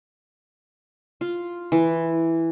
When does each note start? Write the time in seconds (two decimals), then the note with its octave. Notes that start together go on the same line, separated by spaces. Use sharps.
1.21 F4
1.72 E3